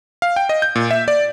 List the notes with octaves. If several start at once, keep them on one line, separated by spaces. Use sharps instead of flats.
F5
G5
D#5
G6
A#2
E5
D5